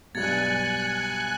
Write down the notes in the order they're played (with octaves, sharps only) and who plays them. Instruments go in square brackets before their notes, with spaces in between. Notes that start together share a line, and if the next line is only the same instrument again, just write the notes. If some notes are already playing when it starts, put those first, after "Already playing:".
[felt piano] B1 G2 [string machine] G#5 F#6 [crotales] G#6 A6 [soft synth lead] C#7